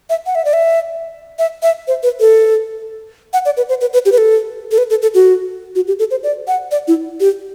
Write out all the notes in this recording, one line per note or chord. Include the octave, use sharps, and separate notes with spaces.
E5
F#5
E5
D5
E5
E5
E5
C5
B4
A4
F#5
D5
B4
C5
B4
B4
G4
B4
A4
A4
B4
A4
A4
F#4
F#4
G4
A4
C5
D5
F#5
D5
E4
G4